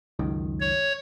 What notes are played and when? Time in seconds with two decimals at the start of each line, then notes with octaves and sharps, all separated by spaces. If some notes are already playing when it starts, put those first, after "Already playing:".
0.19 C#2 F#2 D#3
0.60 C#5